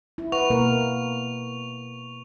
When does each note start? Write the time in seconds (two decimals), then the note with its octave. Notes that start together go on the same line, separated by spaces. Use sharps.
0.18 E4
0.32 B4 F#5 C#6 F7
0.50 B2 A#3 A#4